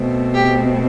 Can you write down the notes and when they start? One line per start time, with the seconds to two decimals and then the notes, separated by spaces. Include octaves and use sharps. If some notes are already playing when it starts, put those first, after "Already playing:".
Already playing: B2 A3 C4
0.34 G4